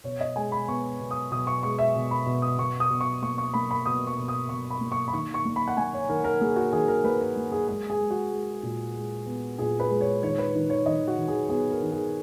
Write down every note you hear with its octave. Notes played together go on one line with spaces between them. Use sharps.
B2 C#5
D#5
G#3 G#5
B5
B3 C#6
B2
D#6
B2 D#6
C#6
G#3 C#6
E5
B2
B5
B2
D#6
B2 C#6
D#6
B2
C#6
A#3 C#6
C#6
A#3 B5
B5
B2 D#6
C#6
B2
D#6
B2 C#6
B5
A#3
C#6
B5
D#3 C#6
C#6
A#3
B5
F#5
A#3 G#5
C#5
D#3 A#4
A#4
A#3 G#4
F#4
D#3 G#4
A#4
A#3 B4
A#4
A#3
G#4
G#3 G#4
G#4
G#3
F#4
G#3
A#2
G#3
B3
A#2 G#4
B4
G#3
C#5
D#3 C#5
B4
D#3
C#5
D#3 D#5
F#4
D#3
G#4
B3 G#4
A#4
D#3
G#4